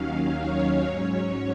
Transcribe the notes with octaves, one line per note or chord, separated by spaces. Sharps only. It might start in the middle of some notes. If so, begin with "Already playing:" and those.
Already playing: D#2 D#3 F#3 C#4 F5
C#5
G#2 F#3 C#4 C#5